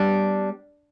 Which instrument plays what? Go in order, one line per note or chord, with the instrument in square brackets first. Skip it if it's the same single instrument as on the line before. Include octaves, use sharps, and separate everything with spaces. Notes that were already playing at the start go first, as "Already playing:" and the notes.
Already playing: [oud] G3 B3 [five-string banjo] D4